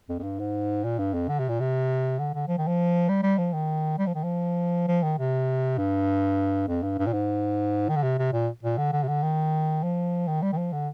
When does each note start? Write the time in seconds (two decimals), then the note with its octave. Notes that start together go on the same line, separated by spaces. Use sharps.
0.09 F2
0.19 F2
0.23 G2
0.39 G#2
0.84 A#2
0.98 G2
1.14 F2
1.28 D3
1.39 C3
1.49 A#2
1.60 C3
2.19 D3
2.34 D3
2.48 F3
2.58 D#3
2.67 F3
3.08 G3
3.23 G3
3.38 F3
3.53 D#3
3.98 G3
4.06 F3
4.15 D#3
4.24 F3
4.88 F3
5.03 D#3
5.19 C3
5.78 G2
6.68 F2
6.83 G2
6.98 G2
7.06 A#2
7.13 G#2
7.89 D#3
7.96 D3
8.03 C3
8.18 C3
8.33 A#2
8.63 A#2
8.77 D3
8.92 D3
9.03 C3
9.08 D3
9.23 D#3
9.83 F3
10.28 D#3
10.42 G3
10.52 D#3
10.57 F3
10.73 D3